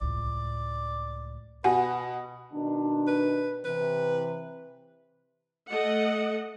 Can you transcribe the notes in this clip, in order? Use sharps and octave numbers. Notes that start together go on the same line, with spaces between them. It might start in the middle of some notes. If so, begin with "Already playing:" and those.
C#2 A2 D5
B2 F#4 B4 F#5 G#5
B2 D#3 D4
B4
C3 E3 B4
A3 D#5 F#5